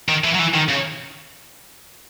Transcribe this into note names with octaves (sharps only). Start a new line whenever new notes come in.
D#3
E3
F#3
E3
D#3
C#3